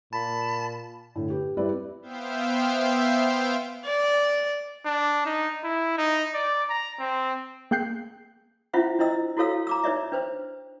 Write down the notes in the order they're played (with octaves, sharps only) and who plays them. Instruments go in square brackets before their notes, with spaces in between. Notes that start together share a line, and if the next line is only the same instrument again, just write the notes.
[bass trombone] A#2 [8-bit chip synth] A5 [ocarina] B5
[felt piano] A2 D3
G4 B4
G3 C4 E4 G4 B4 D5
[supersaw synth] B3 C5 E5 F5 G5
[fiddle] D5
[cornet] D4
D#4
E4
D#4
D5
A#5
C4
[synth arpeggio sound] A#3 G#4 G5 F#6 G6 C7
[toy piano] C#4 E4 F4 C5 E5 F#5
D4 E4 C5 D#5 E6
E4 F#4 A4 C#5 F5 E6
A#5 D6 E6
D#4 B4 C#5 D5 E5
D4 B4 C5